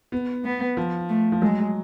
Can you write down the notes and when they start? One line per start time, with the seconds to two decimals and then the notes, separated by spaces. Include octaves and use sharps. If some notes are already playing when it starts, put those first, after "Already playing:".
0.12 B3
0.45 B3
0.77 F3
1.09 A3
1.32 F3
1.42 F#3 G#3